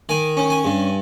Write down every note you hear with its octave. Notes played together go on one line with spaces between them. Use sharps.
D#3 G#5
C#4
G#5
G2